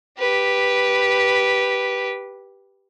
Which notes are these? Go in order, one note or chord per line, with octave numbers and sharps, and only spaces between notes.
G4 B4